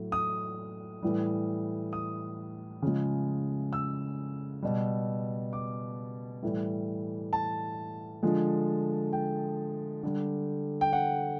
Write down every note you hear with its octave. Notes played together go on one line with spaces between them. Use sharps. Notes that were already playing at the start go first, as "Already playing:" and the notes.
Already playing: A2 F#3
D#6
A2 E3 G3
D#6
C#3 F3 G#3
E6
B2 G3
D6
A2 E3 G3
A5
D3 F3 G#3
G5
D3 G3
G5
F#5